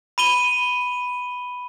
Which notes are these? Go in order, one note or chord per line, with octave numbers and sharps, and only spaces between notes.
B5 D#7 G7